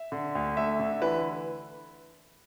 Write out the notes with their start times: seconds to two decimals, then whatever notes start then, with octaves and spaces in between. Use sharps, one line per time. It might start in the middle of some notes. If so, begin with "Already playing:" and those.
Already playing: E5
0.12 D3
0.35 D2
0.57 A3 E5
0.79 D3
1.02 E3 B4